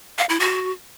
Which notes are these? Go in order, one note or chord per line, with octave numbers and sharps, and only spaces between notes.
F5
E4
F#4